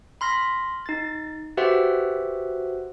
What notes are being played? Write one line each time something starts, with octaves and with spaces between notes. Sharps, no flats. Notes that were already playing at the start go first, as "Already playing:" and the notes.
B5 C6 F6 A#6 B6
D#4 A6
F#4 G4 B4 C5 E5 F#5